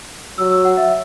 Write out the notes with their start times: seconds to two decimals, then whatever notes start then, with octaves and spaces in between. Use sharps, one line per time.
0.38 F#3 E6
0.52 E6
0.65 F#5
0.77 E5